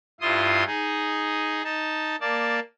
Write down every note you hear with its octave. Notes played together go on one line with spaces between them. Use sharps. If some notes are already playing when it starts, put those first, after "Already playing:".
G2 E4 F4 C6 D#6
D#4 G#4
D#4 A5
A#3 D5 A5